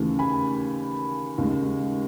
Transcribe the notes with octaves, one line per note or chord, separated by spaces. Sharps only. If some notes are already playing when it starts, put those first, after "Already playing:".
Already playing: D#2 C#3 E3 A3
G#5 B5
D#2 C#3 G#3